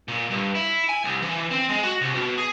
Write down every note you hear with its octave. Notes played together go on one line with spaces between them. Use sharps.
A#2
G2
E4
G#5
C2
E3
C4
G#3
F#4
C2
B2
G#4